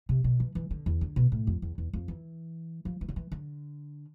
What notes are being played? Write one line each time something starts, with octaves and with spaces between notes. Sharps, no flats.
C3
B2
E3
E3
D3
E2
D3
B2
A2
F2
E2
E2
F2
E3
F3
E3
D3
E3
D3